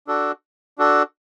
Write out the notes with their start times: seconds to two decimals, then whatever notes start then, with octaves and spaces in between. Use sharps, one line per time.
0.07 D4 F#4 A4
0.78 D4 F#4 A4